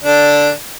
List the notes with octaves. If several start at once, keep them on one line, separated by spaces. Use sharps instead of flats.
D3 D4